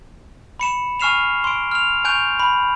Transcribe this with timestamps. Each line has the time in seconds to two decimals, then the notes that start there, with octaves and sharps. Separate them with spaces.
0.60 B5 C#7 E7
1.00 G#5 C#6 F6 C7 E7 F7
1.44 C6 D7
1.71 F6 F7
2.05 G#5 C#6 F#6 G6 D7 F7
2.39 B5